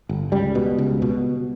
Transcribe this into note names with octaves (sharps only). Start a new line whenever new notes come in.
G1
C#2 G3
B2
C#2
B2